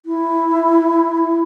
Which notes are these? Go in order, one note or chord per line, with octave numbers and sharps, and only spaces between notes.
E4